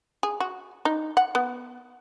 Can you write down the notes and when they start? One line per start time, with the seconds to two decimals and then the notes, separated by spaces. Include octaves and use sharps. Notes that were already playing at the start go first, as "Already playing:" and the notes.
0.23 G#4
0.40 F#4
0.85 D#4
1.17 F#5
1.35 B3